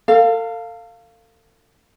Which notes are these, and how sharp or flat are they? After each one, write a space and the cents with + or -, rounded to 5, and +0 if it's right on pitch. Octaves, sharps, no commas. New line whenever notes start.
A4 +40 F5 +0